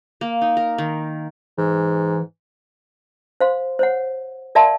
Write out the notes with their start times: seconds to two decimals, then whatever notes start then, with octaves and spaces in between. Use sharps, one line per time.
0.21 A#3
0.41 D#4
0.57 A#4
0.78 D#3
1.58 G#2 E3
3.40 C5 F5 C6
3.79 C5 C#5 F#5
4.55 A#4 D5 E5 F5 A5 C6